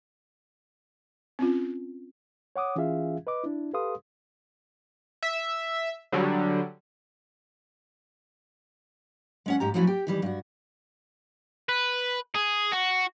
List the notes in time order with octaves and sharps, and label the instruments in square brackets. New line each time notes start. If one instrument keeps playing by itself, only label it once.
[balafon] C4 C#4 F4
[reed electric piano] C#5 F#5 D6 D#6
E3 C#4 F4 G#4 E5 F5
B4 D#5 D6
D4 E4
G4 A4 B4 F5 C6 D#6
[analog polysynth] E5
D3 F#3 G3
[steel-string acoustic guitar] G#3 C#4 F#5
G#2 G4 A#5
F3 F#3 A3 C#4 E4 F#4
G4 G5
D#3 E3 G3
G2 F#4
[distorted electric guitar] B4
G#4
F#4